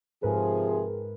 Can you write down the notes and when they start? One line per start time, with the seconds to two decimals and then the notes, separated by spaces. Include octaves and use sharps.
0.23 G#2 C3 F3 G#4 A#4 B4